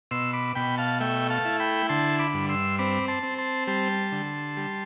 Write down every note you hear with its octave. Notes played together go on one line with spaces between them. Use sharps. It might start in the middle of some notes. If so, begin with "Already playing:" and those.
B2 C6 E6
B5 D6
B2 G5 B5
F5 A5
A3 E5 G5
F5 A5
E4
G5 B5
D3 A5 C6
B5 D6
G2
C6 E6
C4 B5 D6
A5 C6
C4
A5 C6
G3 A5 C6
D3
G3